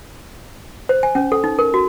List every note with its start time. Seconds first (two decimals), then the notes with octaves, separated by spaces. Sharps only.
0.89 C5
1.03 G#5
1.15 C#4
1.32 A4
1.44 D#4
1.59 A#4
1.74 F#4